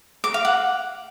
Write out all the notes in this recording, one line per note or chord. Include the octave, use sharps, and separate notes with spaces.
D6
F5
F#5